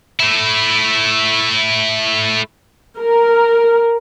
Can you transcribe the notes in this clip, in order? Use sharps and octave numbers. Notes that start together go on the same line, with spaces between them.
A3 E4
A#4